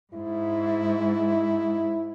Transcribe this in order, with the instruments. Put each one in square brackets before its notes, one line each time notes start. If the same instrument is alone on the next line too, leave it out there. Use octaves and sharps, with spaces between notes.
[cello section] G#2 [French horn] E4